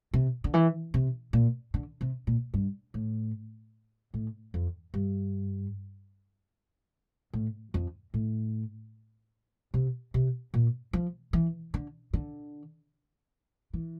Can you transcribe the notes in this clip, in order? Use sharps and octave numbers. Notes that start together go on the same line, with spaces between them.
C3
D3
E3
C3
A#2
D3
C3
A#2
G2
A2
A2
F2
G2
A2
F2
A2
C3
C3
A#2
F3
E3
D3
D3
E3